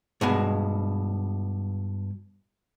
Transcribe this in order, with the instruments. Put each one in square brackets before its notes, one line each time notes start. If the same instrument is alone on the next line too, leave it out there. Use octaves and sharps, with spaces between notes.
[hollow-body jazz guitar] G2 B2 G#3